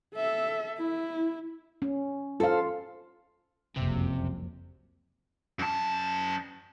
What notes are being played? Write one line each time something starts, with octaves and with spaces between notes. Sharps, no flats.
A4 E5
E4
C#4
F4 A4 C5 F5
F#1 C2 F2 C3
F#2 A5